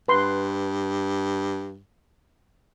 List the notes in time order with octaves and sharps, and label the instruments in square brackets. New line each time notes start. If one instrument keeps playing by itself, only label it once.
[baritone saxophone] G2 [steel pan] B4 C6